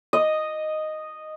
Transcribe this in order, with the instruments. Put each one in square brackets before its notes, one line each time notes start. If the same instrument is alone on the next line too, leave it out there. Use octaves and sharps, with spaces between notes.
[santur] D#5